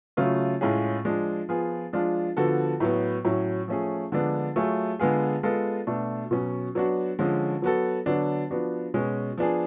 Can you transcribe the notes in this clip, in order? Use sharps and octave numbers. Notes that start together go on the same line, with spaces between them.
C#3 F#3 A3 F4
A2 G#3 C#4 F4 G#4
F3 G#3 D4
F3 B3 F4 G#4
F3 G#3 D4 F4
D3 F3 B3 F#4 A4
A2 F#3 B3
A2 F#3 C#4
F3 A3 C#4 G#4
D3 F3 G#3 B3 D4
F#3 A3 F4 G#4
D3 G#3 B3 F4 G#4
G#3 B3 F4 A4
B2 A3 D4
B2 F#3 C#4
F#3 B3 D4 F#4
D3 F3 G#3 C#4
F#3 B3 F#4 A4
D3 F#3 B3 D4
F3 B3 D4 F#4
B2 G#3 C#4
F3 B3 D4 G#4